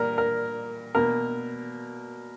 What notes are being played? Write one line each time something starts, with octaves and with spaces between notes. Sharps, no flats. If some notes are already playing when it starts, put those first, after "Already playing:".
Already playing: A#2 G3 A#4
A#4
B2 A#3 A#4